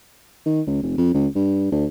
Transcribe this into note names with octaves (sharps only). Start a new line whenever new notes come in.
D#3
C#2
F1
F2
C#2
G2
D2